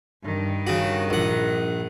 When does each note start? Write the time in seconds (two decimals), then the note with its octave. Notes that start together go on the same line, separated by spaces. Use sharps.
0.24 G2 D#3
0.67 C#3 F#4
1.10 A#1 F#5